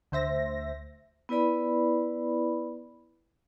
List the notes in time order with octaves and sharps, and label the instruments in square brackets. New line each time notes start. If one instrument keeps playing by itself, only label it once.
[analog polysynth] D2 C5 E5 A#6
[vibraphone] B3 E4 B4 D5 B5